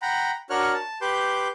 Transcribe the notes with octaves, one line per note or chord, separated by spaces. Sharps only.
F#5 G5 A#5 B5
D4 F#4 A#4 C#5 F6 F#6
A5
G4 B4 C6 D6 G6